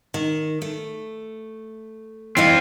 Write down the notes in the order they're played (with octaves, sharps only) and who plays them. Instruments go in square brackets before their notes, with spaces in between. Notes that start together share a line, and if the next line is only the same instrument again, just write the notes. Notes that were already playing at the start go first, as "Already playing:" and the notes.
[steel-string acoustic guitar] D#3
A3
[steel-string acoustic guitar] E3 E4 D#5 [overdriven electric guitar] C4 F4